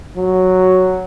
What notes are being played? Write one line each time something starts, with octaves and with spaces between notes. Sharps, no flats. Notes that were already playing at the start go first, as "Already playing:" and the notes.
F#3